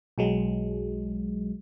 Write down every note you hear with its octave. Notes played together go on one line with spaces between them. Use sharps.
B1 F#3 G#3